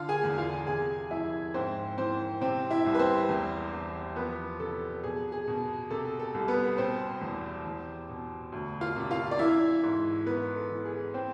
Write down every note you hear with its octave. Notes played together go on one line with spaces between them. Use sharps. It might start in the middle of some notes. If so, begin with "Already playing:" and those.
Already playing: D3 F4 F5
G#4 G#5
E2
F4 F5
C3 G#4 G#5
F2 E4 E5
G#2 C4 C5
E3 C4 C5
C3 C4 C5
E4 E5
C2
B4
C4 C5
E2
E2
F3 B3 B4
C3 A4
B2 G#4
G#4
B2
C3 A4
A4
C2
B3 B4
B2 C4 C5
E2
E2
B2
D2
F4 F5
C3
F4 F5
D5
E3 E4 E5
G#2
E3 B3 B4
A4
E3
G#4
C4 C5